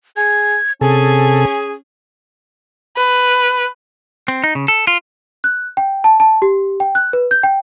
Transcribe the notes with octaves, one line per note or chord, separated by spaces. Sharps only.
G#4 G#6
C3 C#4 G#4 A4
B4
C4
D#4
C#3
A4
F4
F#6
G5
A5
A5
G4
G5
F#6
B4
G6
G5